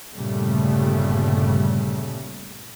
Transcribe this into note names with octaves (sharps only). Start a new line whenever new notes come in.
G1 A#2 C#3 G3 A3